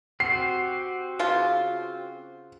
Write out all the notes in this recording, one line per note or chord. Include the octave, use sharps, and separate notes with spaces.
C4 F#4 G4 C7
C#3 F4